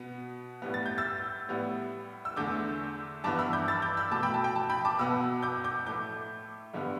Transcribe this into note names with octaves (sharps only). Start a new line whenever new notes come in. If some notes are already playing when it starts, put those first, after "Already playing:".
Already playing: B2 B3
A2 G3 B3
A6
G6
E6 A6
A2 G3 B3
E6
E2 D3 A3 D6 G6
G2 E3 B3 A5 D6
B5 E6
D6 G6
E6 A6
D6 G6
B5 E6
B2 A3 A5 D6
G5 B5
A5
G5
A5
G5 B5
A5 D6
B2 B3 B5 E6
D6 G6
D6 G6
A2 A3 D6 G6
G2 D3 G3 B3